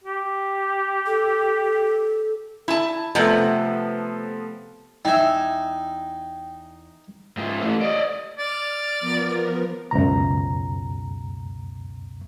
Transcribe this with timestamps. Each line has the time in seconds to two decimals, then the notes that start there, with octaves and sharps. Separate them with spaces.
0.04 G4
1.06 A4
2.68 E4 A5
3.15 C3 F3 A3 B3 A4 F#5
5.05 E2 D#4 E5 G5 G#5
7.37 G#2 F4
7.61 E3 A3
7.81 D5 D#5
8.39 D5 F6
9.00 F3 B3 A#4
9.91 C#2 F#2 B2 A#5